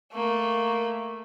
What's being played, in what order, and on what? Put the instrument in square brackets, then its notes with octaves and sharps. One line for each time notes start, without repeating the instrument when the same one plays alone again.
[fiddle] A3 A#3